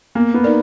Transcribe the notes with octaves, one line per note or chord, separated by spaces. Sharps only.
A#3 B3
B3
D#4 A#4 D5